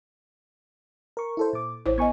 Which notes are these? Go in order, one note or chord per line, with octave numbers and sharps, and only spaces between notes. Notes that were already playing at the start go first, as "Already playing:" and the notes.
A#4 C#6
E4 A4 C5
A#2 D6
A1 E4 C5 C#5
B3 A#4 D#5 G#5 C#6 G#6